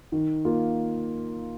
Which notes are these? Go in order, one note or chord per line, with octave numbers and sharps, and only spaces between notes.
D#3
A#3 F4